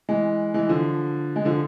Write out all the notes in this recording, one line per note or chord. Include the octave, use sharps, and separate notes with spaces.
E3 G#3
E3 G#3
D3 F3
G#3
D3 F3